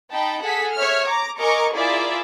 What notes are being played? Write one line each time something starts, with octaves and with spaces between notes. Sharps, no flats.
D#4 G5 A5 B5
G#4 A4 F#5 B6
C#5 E5 F6
A#5 D6
A#4 D#5 G#5 A#5 C#6 D6
E4 F4 G#4 A#4 D5 E5